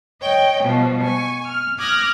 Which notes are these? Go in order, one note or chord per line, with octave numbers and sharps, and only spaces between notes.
C#5 D#5 G5
B2 F3 G3
G#5 C#6
F6
D6 D#6 F6 F#6 G#6 A#6